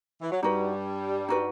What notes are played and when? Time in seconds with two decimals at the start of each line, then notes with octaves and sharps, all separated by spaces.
0.21 E3
0.32 F#3
0.42 G2 G3 D#4 F#4 B4
1.28 D#4 F#4 B4